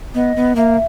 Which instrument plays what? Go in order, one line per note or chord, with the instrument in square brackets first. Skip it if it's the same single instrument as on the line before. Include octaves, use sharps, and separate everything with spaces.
[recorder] B3 [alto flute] D#5
[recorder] B3
[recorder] A#3 [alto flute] E5